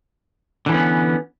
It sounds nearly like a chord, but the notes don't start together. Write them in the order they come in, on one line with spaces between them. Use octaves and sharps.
D3 E3 C#4 B3